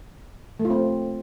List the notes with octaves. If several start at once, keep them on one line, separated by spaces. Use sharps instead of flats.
A3
F4
C4